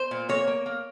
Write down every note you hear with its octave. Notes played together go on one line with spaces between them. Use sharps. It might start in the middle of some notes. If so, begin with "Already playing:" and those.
Already playing: C5
A#2
A#3 C#5
A#3
A#3